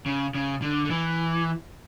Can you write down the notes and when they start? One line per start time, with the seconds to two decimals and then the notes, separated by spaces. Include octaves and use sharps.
0.06 C#3
0.35 C#3
0.62 D3
0.85 D3
0.90 E3